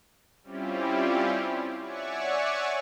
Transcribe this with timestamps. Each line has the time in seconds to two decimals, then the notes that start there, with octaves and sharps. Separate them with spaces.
0.43 G3 C4 C#4 E4 F4 G4
1.81 C#5 D5 E5 F#5 G#5 C#6